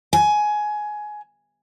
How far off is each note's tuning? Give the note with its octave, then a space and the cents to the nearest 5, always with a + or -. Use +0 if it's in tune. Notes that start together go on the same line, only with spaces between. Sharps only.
G#5 +15